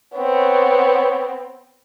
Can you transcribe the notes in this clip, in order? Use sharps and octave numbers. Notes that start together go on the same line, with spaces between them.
B3 C4 C#5